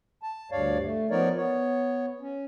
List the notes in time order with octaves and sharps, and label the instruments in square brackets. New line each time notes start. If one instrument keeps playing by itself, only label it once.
[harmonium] A5
D2 G2 C#5 D5 F5
A3
F3 B3 D#4 A#4 C#5 D5
B3 C#5
C#4